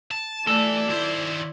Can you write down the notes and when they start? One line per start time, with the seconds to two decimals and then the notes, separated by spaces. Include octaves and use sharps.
0.11 A5
0.47 E3 A3 A4 D5
0.89 D#2 E4 C5